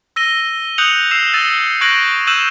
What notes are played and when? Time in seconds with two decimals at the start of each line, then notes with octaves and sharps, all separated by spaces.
0.16 E6 A#6 D#7 G7
0.78 D#6 F#6 G6 C#7 F7 F#7
1.11 E6 C7 E7
1.34 E6 A6 D#7
1.81 C#6 F#6 G#6 A#6 D7 F#7
2.27 E6 F#6 G6 D#7 E7 F#7